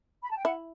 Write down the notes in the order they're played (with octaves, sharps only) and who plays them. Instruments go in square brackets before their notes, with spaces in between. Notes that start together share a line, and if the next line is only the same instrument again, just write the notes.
[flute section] B5
A5
G5
[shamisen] E4 [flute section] F#5